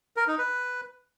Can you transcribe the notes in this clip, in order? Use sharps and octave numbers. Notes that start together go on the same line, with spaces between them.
A#4
D#4
B4